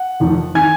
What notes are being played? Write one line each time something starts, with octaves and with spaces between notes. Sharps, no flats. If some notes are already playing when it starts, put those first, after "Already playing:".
Already playing: F#5
F1 F2 D#3
D#3 G#5 G#6